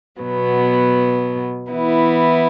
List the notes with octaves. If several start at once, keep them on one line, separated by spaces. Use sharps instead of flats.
B2 F#3 B3
E3 B3 E4